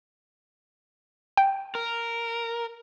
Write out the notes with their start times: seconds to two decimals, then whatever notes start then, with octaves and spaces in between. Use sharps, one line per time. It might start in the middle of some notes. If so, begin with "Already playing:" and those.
1.37 G5
1.75 A#4